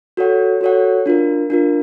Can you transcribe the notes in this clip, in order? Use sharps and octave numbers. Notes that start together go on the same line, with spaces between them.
F#4 A4 C#5 F#5
F#4 A4 C#5 F#5
D4 F4 A#4
D4 F4 A#4